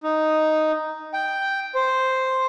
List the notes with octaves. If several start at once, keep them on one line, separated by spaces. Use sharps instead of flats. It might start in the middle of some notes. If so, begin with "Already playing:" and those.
D#4
G5
C5